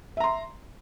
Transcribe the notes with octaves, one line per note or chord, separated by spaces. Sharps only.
E5 A#5 C6